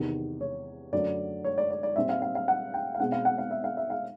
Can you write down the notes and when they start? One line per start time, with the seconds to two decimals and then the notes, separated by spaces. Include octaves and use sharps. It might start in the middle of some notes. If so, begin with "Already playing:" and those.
Already playing: E2 C3 D#3
0.41 C#5
0.92 F#2 D3 F#3 A3 D5
1.44 C#5
1.58 D5
1.71 D5
1.83 D5
1.96 A#2 G3 C4 E5
2.09 F5
2.22 F5
2.35 F5
2.48 F#5
2.74 G5
2.95 F5
3.00 B2 G#3 C4 F#5
3.12 F5
3.25 F#5
3.38 F5
3.51 E5
3.64 F5
3.77 E5
3.90 F5